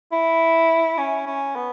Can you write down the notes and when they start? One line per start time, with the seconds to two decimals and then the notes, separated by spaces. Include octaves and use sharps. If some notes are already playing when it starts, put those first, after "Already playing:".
0.12 E4
0.98 C#4
1.27 C#4
1.56 B3